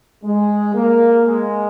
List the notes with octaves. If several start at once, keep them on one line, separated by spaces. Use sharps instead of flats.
G#3
A#3
G#3